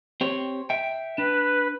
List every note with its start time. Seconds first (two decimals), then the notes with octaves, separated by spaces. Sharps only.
0.21 C4 G4 C#5
0.70 E5 G5
1.18 D4 B4